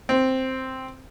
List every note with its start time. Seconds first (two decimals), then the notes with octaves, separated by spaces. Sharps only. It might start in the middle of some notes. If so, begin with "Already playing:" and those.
0.09 C4